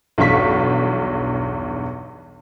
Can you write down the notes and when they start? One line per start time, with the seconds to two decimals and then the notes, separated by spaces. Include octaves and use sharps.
0.18 B1 E2 G2 F5 C#6 B6